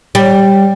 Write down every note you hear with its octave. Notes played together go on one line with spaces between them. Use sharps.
G3